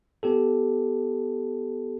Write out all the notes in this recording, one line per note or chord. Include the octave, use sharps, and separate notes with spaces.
B3 G4 A4